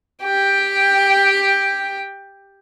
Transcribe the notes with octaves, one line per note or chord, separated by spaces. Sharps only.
G4 G5